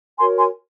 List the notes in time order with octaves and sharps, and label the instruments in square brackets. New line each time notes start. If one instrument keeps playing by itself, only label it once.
[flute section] F#4 A#4 C#5 G#5 C6
G#5 C6